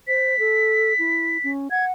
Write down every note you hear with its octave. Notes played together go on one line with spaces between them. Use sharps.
C5 B6
A4
E4
C#4
F#5 G#6